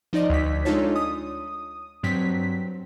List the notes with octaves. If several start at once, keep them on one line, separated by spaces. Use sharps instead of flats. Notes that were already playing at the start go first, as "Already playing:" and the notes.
F3 D#4 D5 D#5
D2 B6
G#3 D4 D#4 F4 A4 C#5
D#6
G2 F#3 C4 B6